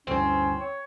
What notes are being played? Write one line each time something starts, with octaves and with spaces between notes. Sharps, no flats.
D2 G2 E3 C4 C#4
C#5